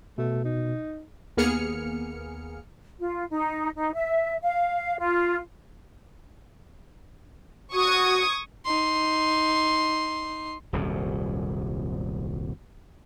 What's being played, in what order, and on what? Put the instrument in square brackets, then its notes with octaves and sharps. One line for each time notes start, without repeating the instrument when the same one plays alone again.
[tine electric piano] B2 [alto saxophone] A3
[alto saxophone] D#4
[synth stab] D#2 A#3 B3 G#4 F6 C#7
[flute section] F4
D#4
D#4
E5
F5
F4
[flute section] F#4 [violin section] C#6 D#6 G#6
[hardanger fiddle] D#4 C6
[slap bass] D#1 C2 F#2